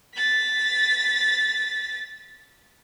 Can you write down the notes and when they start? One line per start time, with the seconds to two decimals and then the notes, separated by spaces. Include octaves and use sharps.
0.15 A6 B6